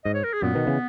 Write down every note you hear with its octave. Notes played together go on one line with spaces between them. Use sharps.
G#2 D#5
C#5
A#4
G#4
F#2 A#2 B3
B2 D#3
C#3 E3